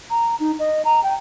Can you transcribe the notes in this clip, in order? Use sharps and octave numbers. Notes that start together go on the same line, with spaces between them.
A#5
D#4
D#5
A#5
G5